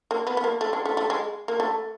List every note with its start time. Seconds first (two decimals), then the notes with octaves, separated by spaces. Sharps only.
0.11 A#3
0.27 B3
0.37 B3
0.44 A#3
0.61 A3
0.73 G#3
0.85 A3
0.97 A3
1.10 G#3
1.48 A#3
1.60 A3